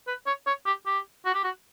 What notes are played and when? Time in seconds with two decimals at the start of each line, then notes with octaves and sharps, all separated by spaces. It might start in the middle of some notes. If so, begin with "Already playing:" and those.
0.07 B4
0.26 C#5
0.47 C#5
0.66 G4
0.86 G4
1.25 F#4
1.34 G4
1.44 F#4